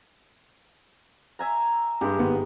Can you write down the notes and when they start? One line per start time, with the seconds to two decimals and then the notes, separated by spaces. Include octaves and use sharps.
1.39 E5 G#5 A#5
2.01 G2 G#3 G4
2.18 G#1 B3